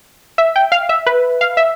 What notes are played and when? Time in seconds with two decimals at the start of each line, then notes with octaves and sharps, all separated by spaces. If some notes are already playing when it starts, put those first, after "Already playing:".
0.38 E5
0.56 G5
0.72 F5
0.89 E5
1.07 B4
1.41 F5
1.57 E5